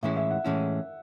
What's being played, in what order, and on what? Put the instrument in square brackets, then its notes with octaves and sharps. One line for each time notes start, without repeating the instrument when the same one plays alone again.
[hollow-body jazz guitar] A2 E3 G#3 C#4 E4 [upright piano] E5
[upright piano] E5
F#5
[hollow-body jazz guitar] A2 E3 G#3 C#4 E4